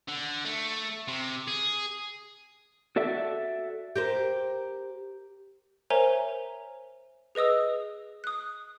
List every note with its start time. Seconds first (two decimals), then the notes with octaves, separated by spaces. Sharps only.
0.08 D3
0.45 A3
1.08 C3
1.48 G#4
2.96 F#4 A4 D5 E5
3.96 G4 A#4 C5
5.90 A#4 C5 C#5 E5 G#5 A#5
7.35 G#4 B4 D#5 D#6 E6
8.24 D#6 F#6